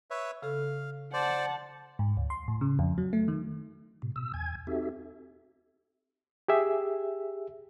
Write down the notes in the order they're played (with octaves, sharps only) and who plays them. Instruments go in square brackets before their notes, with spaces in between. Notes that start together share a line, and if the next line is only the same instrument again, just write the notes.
[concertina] B4 C#5 E5
[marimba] C#3 A4 [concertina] F5
[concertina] C5 D5 [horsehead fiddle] F#5 A5
[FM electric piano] G#2
D2
C6
A2
C#3
F2
F#3
A3
D#3
[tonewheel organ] A2 C3
B2 E6
E2 G#5 G#6
C4 D#4 F#4 G4 A4 E5
[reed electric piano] G4 G#4 E5